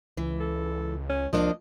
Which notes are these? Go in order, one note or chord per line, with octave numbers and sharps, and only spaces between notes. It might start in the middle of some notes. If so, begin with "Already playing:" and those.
C#2 E3
A4
C#4
C2 F3 A#3 D4 D#5